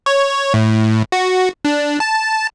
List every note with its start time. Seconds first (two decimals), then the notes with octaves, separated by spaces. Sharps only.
0.06 C#5
0.54 A2
1.12 F#4
1.65 D4
2.00 A5